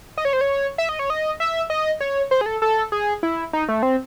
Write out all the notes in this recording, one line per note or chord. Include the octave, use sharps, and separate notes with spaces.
D#5
C#5
C5
C#5
E5
D#5
C#5
D#5
E5
D#5
C#5
C5
G#4
A4
A4
G#4
E4
D#4
A3
C4